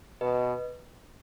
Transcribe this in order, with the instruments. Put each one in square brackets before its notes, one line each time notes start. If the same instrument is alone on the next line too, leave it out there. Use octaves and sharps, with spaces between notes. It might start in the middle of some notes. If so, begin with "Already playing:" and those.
[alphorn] B2 [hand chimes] B4 D#5